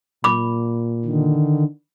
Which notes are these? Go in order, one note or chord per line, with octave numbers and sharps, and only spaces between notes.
A#2 B5 D6
D3 D#3